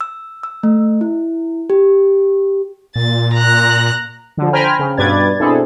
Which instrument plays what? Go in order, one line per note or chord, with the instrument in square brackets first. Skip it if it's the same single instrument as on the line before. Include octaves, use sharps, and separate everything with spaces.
[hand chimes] E6
E6
A3
E4
G4
[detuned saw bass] A#2 [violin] A6
[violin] A#5 F#6
[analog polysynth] D3 F3
C5 G5 G#5 A#5 B5 F6
C#3
G2 B2 B4 D5 G#6 A6
B2 C4 D4 E4 G#4 A4